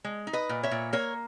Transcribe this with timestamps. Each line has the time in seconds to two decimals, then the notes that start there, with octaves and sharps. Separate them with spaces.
0.04 G#3
0.27 D#4
0.33 B4 D#5
0.49 A#2
0.63 C#5 E5
0.71 A#2
0.93 A#3 A#4 C#5